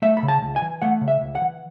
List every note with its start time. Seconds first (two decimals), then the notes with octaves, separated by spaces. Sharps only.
0.02 A3 E5
0.17 B5
0.23 C#3
0.28 A5
0.42 C#2
0.56 G#5
0.62 E3
0.82 A3 F#5
1.01 C#3
1.08 E5
1.21 C#2
1.35 F#5
1.42 E3